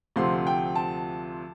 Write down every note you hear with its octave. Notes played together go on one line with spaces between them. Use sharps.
D2 C3 F3 C4 F4 C6
G5
A5